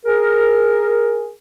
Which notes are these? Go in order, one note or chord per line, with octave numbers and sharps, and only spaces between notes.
G#4 A#4